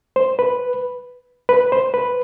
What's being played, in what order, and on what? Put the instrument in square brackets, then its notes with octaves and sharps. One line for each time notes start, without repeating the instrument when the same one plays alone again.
[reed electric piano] C5
B4
B4
C5
B4